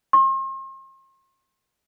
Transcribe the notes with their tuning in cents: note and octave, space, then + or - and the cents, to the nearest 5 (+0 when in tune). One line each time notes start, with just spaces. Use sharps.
C6 +45